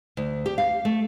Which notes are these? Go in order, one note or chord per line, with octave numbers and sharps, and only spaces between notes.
D2
G4
F5
A3